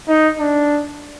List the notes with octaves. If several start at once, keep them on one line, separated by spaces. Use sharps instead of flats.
D#4
D4